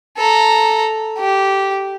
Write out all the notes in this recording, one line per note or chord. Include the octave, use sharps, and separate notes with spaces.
A4 A#5
G4